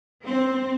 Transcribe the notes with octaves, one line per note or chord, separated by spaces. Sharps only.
C4